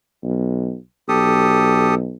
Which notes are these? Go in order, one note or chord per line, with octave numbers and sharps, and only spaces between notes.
B1
B1 G4 A4 D#6